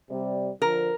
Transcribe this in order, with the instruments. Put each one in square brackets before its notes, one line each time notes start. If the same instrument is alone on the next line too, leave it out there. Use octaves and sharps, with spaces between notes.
[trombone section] C3 G3
[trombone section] D3 F3 [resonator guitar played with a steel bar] A#4